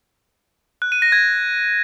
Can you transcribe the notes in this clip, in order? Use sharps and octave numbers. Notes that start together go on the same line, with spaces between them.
F#6
D#7
A#6
G#6